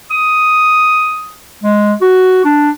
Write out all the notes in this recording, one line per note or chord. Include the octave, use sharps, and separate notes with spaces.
D#6
G#3
F#4
D4